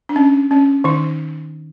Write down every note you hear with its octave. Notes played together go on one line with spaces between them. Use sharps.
D4
C#4
C#4
D#3 D#4